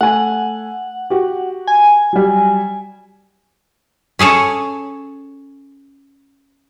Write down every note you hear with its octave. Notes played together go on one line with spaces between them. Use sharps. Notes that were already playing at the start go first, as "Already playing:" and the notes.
A3 F#5 G#5
F#4 G4
G#5
F#3 G3
C#4 G#4 A4 C#5